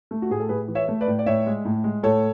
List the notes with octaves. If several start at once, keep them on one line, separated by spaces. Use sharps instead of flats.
A3
F#4
A2 G#4
A4
A2 G#4 B4
E3
C#5 E5
A3
B4 D5
A2
D5
A2 C#5 E5
G#3
A2
G#3
A2 A4 C#5